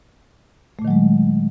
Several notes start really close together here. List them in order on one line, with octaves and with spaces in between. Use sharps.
A3 A#2 D#3 F#3 G#3